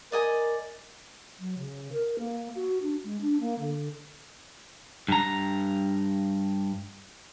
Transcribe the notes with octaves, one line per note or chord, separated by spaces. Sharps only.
A#4 D5 D#5 G#5
F#3
C#3
A#4
A#3
F#4
D4
G#3
D4
A#3
D3
G2 A#5